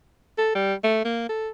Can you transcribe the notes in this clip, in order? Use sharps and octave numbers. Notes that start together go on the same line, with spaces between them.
A4
G3
A3
A#3
A4